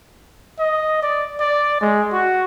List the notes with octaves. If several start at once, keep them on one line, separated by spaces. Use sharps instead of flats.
D#5
D5
D5
G#3
F#4